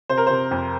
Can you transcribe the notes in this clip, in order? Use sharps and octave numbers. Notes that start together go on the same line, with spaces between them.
C3 C5
A#4
C3 C5
F2